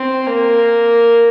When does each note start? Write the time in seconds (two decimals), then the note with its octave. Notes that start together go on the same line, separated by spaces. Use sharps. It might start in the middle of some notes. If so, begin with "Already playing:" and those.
Already playing: C4
0.26 A#3